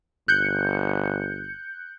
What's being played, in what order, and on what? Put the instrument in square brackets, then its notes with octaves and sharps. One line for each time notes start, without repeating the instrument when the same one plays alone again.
[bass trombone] G1 [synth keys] F#6 G6 C#7